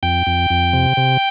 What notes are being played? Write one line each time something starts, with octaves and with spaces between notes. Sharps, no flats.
F2 G5
F2
F2
C3
C3